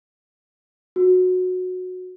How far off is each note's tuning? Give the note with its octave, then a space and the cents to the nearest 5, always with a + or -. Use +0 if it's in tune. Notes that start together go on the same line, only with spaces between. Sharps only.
F#4 -15